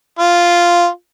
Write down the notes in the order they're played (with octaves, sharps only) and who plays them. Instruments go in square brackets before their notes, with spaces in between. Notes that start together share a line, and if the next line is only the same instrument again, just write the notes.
[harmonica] F4